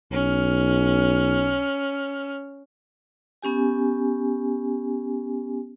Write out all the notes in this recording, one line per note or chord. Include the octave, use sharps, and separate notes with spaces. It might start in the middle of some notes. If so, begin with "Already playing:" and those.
B1 C#4 F6
B3 C#4 G4 G#5